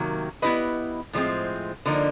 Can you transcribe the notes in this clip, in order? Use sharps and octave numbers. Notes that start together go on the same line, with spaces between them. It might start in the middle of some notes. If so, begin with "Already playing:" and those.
Already playing: C3 D#3 F#3 A#3
B3 E4 G4 B4 D#5
A2 F3 G#3 C4
D3 F3 A#3 D#4